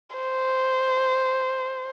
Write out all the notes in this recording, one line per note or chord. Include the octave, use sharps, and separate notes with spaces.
C5